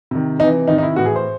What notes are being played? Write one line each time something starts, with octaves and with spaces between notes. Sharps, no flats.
C3 D#3
C3 E3 D#4
C3 D#3 D#4
D#4
E4
A2 E3 F#4
G#4
C5